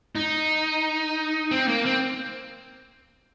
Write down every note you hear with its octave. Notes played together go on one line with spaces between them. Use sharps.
D#4
C4
A#3
C4